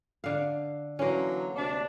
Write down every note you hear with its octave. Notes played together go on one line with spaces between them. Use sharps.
D3 F5
D3 E3 F#3 A#3 C#4
D2 C3 D4